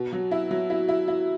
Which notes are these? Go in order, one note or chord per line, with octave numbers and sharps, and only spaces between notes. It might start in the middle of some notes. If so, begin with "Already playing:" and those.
Already playing: B2
F#3
E4
F#3
E4
E4
E4